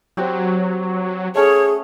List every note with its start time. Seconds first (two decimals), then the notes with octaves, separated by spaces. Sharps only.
0.17 F#3 C4 F#4 G4
1.35 A3 C#4 G#4 C#5